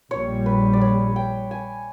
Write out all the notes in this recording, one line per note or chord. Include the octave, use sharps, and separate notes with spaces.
A#1 A#2 G3 C#5
B4
D5
C#5
G5
G#5